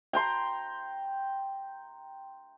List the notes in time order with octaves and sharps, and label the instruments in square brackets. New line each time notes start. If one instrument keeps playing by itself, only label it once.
[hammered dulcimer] G5 A#5 C6